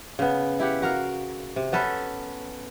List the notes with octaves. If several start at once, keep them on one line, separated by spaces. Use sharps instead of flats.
C#3 B3
E4 G4 F#5
F#4 A#4 F5
C3
B3 C#4 A4 B4